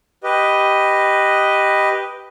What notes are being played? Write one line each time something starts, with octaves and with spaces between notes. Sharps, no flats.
G4 B4 D#5